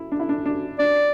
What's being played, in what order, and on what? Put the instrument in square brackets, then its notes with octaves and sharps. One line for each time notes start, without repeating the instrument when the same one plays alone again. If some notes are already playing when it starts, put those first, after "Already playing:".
Already playing: [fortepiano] E4
D4
E4
D4
D4
[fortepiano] D4 [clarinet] D5